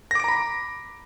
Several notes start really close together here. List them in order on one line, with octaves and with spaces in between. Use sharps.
A#6 D6 D7 A#5 B5